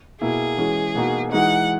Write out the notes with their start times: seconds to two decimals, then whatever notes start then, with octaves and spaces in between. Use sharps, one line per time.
0.21 B2 A#3 E4 G#4
0.58 E3 G#3 C#4 F#4
0.95 B2 A#3 D#4 F#4
1.31 E3 G#3 D#4 F#4 F#5